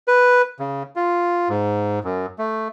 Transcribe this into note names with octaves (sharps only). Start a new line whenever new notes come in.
B4
C#3
F4
G#2
F#2
A3